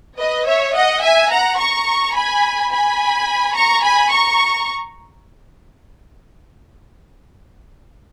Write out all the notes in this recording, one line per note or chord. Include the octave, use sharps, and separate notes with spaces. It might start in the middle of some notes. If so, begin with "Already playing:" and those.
B4 D#5
C#5 E5
D#5 F#5
E5 G#5
F#5 A#5
A#5 C#6
G#5 B5
G#5 B5
A#5 C#6
G#5 B5
A#5 C#6